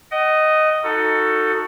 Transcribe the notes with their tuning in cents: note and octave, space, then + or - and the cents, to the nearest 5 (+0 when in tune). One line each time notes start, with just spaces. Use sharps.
D#5 +0 F#5 +40
D#4 +10 F#4 +0 A4 +20